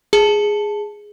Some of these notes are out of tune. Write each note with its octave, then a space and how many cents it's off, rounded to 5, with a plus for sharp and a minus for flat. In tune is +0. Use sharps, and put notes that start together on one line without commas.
G#4 +0 A5 +0